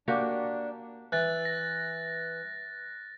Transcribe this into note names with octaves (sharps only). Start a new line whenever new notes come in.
A#3 D4 F#4 G4
E3 F#6 A6
A#6